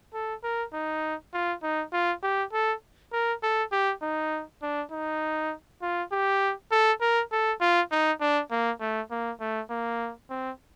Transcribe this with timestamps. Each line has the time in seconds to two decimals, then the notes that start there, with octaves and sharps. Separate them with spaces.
0.14 A4
0.44 A#4
0.73 D#4
1.34 F4
1.63 D#4
1.93 F4
2.23 G4
2.53 A4
3.13 A#4
3.43 A4
3.72 G4
4.02 D#4
4.63 D4
4.92 D#4
5.82 F4
6.12 G4
6.72 A4
7.01 A#4
7.32 A4
7.61 F4
7.91 D#4
8.21 D4
8.51 A#3
8.81 A3
9.11 A#3
9.41 A3
9.70 A#3
10.30 C4